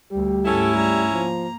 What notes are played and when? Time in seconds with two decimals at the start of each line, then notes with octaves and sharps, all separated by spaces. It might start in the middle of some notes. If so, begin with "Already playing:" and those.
0.11 D2 G3 G4
0.45 G#2 A3 C#4 E4 A4
0.75 G3 A#5
1.12 F3 A#3